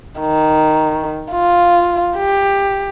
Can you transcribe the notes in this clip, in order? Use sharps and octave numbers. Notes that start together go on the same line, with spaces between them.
D#3
F4
G4